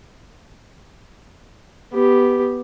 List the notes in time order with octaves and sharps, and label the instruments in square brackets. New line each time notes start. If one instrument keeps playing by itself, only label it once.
[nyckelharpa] B3 G4